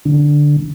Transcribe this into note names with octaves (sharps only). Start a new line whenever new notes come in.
D3